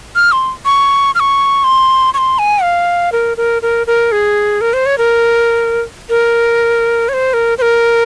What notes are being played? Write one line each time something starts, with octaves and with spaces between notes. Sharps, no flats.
F6
C6
C#6
F6
C#6
C6
C#6
C6
G#5
F5
A#4
A#4
A#4
A#4
G#4
A#4
C5
C#5
A#4
A#4
C#5
C5
A#4
C5
A#4